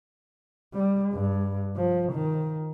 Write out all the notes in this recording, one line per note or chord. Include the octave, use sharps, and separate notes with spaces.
G3
G2
F3
D#3